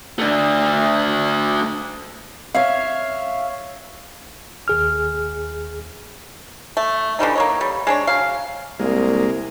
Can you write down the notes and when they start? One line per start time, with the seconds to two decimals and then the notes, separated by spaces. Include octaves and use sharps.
0.19 A3 D4
2.54 C#5 E5 F5
4.68 D#2 G#4 F6
6.77 A3
7.19 D3 E3 G3 D#4
7.35 A#3 C#5 D#5
7.61 G3
7.87 G#3 D4 C#5
8.07 F#3 F5
8.79 C2 G#3 A#3